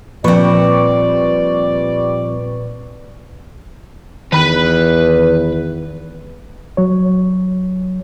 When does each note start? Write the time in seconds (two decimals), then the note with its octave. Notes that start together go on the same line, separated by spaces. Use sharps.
0.24 A#2 F3 G3 C4 B4 D5 C#6
4.33 E2 D#3 B4 B5
6.77 F#3 C#5